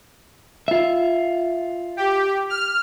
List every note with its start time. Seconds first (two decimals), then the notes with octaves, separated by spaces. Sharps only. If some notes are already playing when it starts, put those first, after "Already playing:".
0.68 F4 E5
1.97 G4
2.50 F6